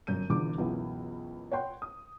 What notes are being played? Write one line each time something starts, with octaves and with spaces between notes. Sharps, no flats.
G1 F#2 G6 D#7
E1 E2 D3 F4 D6
C#2 F#2 B2 E3 B3
C#5 F#5 G5 C6
D#6